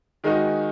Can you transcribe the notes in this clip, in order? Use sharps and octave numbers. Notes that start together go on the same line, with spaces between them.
D#3 G#3 D#4 F#4